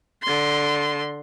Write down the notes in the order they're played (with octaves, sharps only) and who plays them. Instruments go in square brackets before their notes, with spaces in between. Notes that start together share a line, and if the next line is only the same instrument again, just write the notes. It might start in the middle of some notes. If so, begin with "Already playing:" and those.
[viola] D3 C6